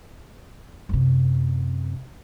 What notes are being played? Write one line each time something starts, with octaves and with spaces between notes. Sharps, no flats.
F#2 C3